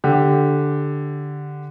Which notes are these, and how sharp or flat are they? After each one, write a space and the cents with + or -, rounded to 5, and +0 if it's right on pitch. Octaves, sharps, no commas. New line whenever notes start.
D3 +0 G4 +0